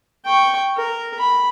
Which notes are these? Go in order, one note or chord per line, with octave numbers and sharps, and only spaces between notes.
G5 C#6
A#4
B5